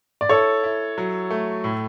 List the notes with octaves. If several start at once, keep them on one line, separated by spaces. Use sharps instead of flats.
D5
E4 A4 C#5
E4
F#3
A3
A2